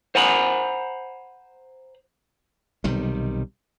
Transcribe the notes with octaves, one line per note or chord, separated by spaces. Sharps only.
C5 F#5 G#5 A#5 B5
B1 C3 D#3 G3